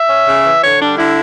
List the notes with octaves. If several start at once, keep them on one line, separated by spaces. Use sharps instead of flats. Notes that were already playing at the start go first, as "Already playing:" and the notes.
Already playing: E5
C#4
C#3
E3
D3 C#5
G3 D4
D3 E4